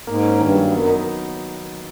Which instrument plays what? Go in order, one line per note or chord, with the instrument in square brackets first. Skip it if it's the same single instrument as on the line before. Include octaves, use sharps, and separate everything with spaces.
[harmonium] G#2 [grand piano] A#3
[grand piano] C#4
[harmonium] G2 [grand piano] D#3
[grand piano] F#3
[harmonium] F#2 [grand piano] B3
[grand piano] D#4